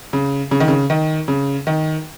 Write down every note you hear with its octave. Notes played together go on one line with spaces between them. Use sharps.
C#3
C#3
D#3
C#3
D#3
C#3
D#3